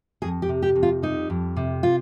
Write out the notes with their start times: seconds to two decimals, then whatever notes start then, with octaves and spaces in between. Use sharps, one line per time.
0.22 F2 G#4
0.42 G4
0.49 C3
0.62 G4
0.75 F2
0.83 F4
1.02 G3 D#4
1.30 F2
1.57 C3
1.83 F4